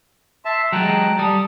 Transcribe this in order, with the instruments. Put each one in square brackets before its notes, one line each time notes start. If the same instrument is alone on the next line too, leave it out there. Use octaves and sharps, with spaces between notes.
[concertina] E5 A5 [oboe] C6
[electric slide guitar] F#3 G#3 [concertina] G5 A5 F#6 [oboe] A#5
[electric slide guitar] G3 [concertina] A4 D#6 [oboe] A5